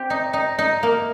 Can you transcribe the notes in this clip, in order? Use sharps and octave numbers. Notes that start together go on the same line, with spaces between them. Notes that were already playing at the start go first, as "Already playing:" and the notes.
Already playing: C4 G4
D#4
D#4
D#4
A#3